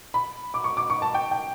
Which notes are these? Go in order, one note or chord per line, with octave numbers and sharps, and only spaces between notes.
B5
D6
C#6
D6
C#6
A5
G5
G5